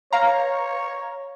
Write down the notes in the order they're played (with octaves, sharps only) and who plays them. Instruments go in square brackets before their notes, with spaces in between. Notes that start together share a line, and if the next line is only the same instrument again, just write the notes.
[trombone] C#5 [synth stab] F5 A#5